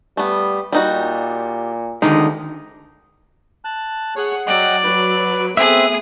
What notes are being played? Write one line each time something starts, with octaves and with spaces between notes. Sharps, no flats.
G3 A3 B3
A#2 G3 D#4 F#4
D2 D3 D#3 G#3 D#4
A5 F#6
G#4 C#5 F#5
F#3 D5 D#5 F#5 G5
F#3 B4
A3 B3 C4 G#4 E5 D#6 F#6